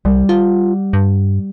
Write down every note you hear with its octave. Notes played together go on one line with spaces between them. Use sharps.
C2 G3 F#5
F4
G2